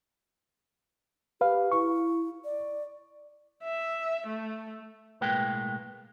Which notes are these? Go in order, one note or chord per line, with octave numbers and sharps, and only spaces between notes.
G4 B4 F5
E4 C#6
D5
E5
A3
B1 A2 G#3 A#3 B4 G5